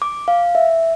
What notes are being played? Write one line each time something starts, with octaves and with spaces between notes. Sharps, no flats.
D6
F5
E5